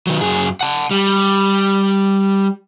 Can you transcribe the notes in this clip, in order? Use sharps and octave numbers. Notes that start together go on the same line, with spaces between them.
D#3 F#3
F#2 G#4
F#5 A5
G3